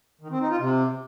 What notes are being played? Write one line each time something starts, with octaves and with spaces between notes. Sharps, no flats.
D#3
C4
D#4
F4
C3